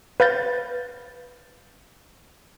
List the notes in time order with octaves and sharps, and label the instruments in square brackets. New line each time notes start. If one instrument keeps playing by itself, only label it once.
[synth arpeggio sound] B4 F5 G6 A6